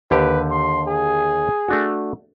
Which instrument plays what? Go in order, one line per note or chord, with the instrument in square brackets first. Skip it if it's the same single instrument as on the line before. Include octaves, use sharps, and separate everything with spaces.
[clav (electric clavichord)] D#2 D3 G4 [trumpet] B4
[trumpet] C6
G#4
[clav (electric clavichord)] A3 D4 F#4